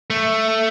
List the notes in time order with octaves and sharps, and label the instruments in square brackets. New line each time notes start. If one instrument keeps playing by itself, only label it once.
[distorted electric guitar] A3